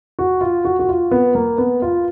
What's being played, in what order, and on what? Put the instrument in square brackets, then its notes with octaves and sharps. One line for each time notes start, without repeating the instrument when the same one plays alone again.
[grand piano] F#4
F4
F#4
F#4
F4
B3
A#3
B3
F4